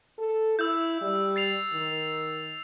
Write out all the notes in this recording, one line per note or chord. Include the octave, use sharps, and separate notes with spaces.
A4
E4 E6 G6
G3
A6 C7 F7
D#3